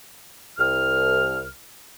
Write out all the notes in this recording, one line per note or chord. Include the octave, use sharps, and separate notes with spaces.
C2 F6